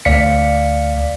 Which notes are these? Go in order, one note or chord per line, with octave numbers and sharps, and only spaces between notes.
D2 D5 F5 B6 C#7